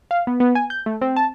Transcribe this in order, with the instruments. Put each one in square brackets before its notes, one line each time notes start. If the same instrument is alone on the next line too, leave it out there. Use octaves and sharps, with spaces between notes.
[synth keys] F5
B3
B3
G#5
G6
A3
C4
A5